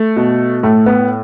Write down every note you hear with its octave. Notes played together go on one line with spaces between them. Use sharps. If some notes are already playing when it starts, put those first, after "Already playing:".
Already playing: A3
B2
A2 A3
B3